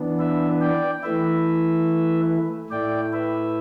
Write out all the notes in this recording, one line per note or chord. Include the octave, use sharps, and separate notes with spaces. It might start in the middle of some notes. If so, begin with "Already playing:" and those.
Already playing: E3 B3 D4
B4 E5
D5 G5
E3 A3 E4 B4 E5
A2 A3 E4 D5 G5
B4 E5